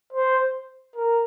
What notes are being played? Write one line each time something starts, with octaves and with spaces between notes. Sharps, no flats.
C5
A#4